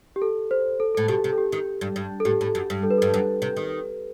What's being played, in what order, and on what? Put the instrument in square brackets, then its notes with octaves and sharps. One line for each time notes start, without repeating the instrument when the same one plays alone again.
[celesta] G4
A4
C5
A4
[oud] A2 [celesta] A4
[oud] B2 [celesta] G4
[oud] C3
[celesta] A4
G4
[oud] D#3
G2
G2
[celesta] A4
[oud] A2 [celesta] G4
[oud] A2
F#2
G2
[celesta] A4
B4
[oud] G2 [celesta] A4
[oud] F#2
C3
D#3